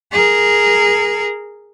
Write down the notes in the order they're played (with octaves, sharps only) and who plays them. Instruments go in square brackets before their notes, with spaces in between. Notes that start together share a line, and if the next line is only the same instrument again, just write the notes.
[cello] G#4 A#4